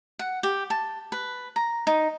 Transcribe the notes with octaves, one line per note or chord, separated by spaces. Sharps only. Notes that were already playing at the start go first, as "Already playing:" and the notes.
F#5
G4
A5
B4
A#5
D#4